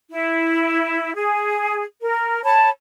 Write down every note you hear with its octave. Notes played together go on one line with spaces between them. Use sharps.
E4
G#4
A#4
C#5 A5 B5